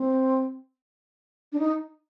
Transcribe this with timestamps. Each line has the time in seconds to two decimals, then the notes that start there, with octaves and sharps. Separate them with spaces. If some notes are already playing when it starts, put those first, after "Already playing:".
Already playing: C4
1.53 D4
1.59 D#4